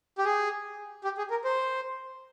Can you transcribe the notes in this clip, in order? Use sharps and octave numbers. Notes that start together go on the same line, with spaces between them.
G4
G#4
G4
G#4
A#4
C5